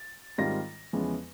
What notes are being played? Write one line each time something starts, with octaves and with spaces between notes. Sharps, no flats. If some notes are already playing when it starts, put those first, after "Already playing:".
Already playing: A6
G#2 D#3 G3 C4 F4 A#6
E2 C#3 F3 G#3 B3